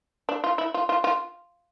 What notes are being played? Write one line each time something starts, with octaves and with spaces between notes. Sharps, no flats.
D4
F4
E4
F4
F4
F4